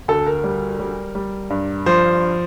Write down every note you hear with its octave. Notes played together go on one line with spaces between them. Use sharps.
D2 A4
A#4
G3
G3
G3
G2
F3 C5